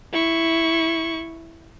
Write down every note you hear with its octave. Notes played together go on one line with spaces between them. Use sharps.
E4 C#6